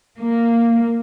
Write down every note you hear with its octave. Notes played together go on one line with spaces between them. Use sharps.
A#3